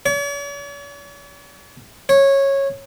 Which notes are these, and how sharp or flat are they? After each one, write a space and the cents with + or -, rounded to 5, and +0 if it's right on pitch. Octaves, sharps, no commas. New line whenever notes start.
C#5 +45
C#5 -15